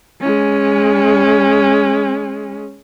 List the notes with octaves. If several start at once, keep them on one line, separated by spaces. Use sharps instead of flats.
G#3 C#4